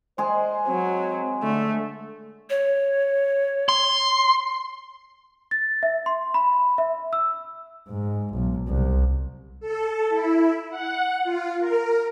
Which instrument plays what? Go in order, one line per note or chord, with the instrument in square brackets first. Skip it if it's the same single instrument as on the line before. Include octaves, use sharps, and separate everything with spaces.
[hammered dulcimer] G#3 G#4 [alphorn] C5
[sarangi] F#3 [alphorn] C4
[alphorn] D3 [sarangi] A3
[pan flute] C#5
[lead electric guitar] C6
[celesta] A6
E5
C6
B5
E5
E6
[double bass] G#2
B1
C2
[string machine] A4
E4
F#5
F4
A#4